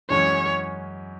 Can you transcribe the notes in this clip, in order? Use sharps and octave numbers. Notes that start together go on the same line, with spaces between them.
F#2 E3 G#3 C#4 C#5